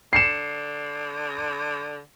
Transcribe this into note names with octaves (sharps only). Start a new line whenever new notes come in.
D3 C7 C#7 E7